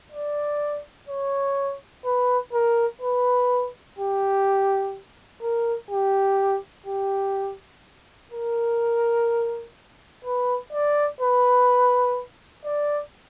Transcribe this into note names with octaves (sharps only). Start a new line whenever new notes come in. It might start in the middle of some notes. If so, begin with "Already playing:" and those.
D5
C#5
B4
A#4
B4
G4
A#4
G4
G4
A#4
B4
D5
B4
D5